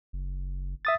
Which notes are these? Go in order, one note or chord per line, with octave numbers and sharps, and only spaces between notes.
F#1
E5 D#6 A6